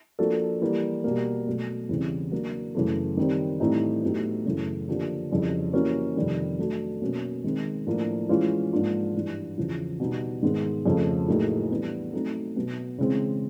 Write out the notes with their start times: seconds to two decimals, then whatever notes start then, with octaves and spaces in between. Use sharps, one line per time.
0.19 F3 A#3 D4 F#4 A4
0.61 E3 G3 A#3
1.04 B2 G3 A#3
1.47 B2 F#3 A3
1.89 E2 C#3 E3 G3 C4
2.32 F#3 A#3 D4
2.75 F#2 C#3 E3 A3
3.17 D#3 G3 C4
3.60 A2 E3 G3 C4 D#4
4.03 A2 F#3 B3 D#4 G4
4.46 F#2 C#3 E3 A3
4.88 D3 F3 A#3 D4 G4
5.30 F2 C#3 E3 G3
5.73 E3 G3 A#3 C#4 F#4
6.16 F2 C3 D#3 G3
6.59 F#3 A3 D4 F#4
7.02 B2 F#3 A#3 C#4
7.44 D#3 G#3 C4
7.87 A2 F3 A#3 D4
8.29 E3 G#3 C#4 F4
8.73 G#2 F3 A#3 D4 F4
9.14 G2 E3 G3
9.58 E2 C#3 F3
10.00 B2 G3 B3 D#4
10.42 G#2 D#3 G#3 B3
10.86 F2 C#3 F3 A3
11.28 A2 F#3 A#3 D#4 G#4
11.70 E3 G3 B3 D4
12.13 F#3 A3 C4 D#4
12.56 B2 F#3 B3
12.98 C#3 E3 G#3 C4